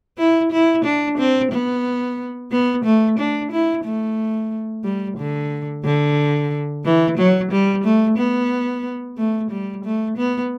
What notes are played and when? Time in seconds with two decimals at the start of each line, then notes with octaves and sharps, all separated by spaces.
0.18 E4
0.52 E4
0.85 D4
1.18 C4
1.52 B3
2.52 B3
2.85 A3
3.19 D4
3.52 E4
3.85 A3
4.84 G3
5.18 D3
5.85 D3
6.85 E3
7.18 F#3
7.52 G3
7.84 A3
8.18 B3
9.18 A3
9.51 G3
9.85 A3
10.17 B3